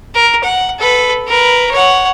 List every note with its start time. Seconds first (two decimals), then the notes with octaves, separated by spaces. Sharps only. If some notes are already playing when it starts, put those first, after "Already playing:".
0.15 A#4
0.43 F#5
0.79 A4 B4
1.28 A#4 B4
1.71 C#5 F#5